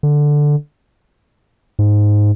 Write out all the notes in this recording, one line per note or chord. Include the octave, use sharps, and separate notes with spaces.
D3
G#2